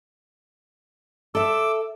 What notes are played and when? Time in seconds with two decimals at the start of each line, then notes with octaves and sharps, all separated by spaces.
1.35 A4 E5 D6 E6